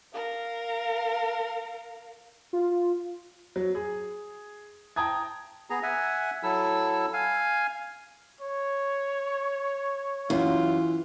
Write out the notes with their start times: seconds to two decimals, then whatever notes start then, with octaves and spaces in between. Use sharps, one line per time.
0.14 A#4 F5
2.53 F4
3.56 F#3
3.75 G#4
4.96 G5 A5 A#5 D#6 G#6
5.70 B3 G#4 A#5
5.83 E5 F#5 G#5
6.43 F#3 E4 A4 E6
7.13 F5 G#5
8.41 C#5
10.30 F#2 E3 F4